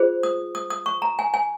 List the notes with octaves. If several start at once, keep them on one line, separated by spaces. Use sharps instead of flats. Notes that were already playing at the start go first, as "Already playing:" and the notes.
Already playing: F4 G#4 C5
D#6
D#6
D#6
C#6
A#5
G#5
G#5